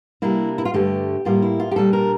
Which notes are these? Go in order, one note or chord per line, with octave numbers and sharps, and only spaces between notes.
C3 G3 A#3 D4 E4
E4
F4
G2 D3 A3 G4
A2 G3 A#3 F4
E4
F4
G4
A#2 G3 D4 A4
A#4